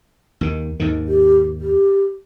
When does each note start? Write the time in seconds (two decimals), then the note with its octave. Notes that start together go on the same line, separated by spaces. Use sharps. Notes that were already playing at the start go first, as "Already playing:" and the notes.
0.41 D#2 D#3
0.80 D#2 G#2 D#3
1.08 G4
1.61 G4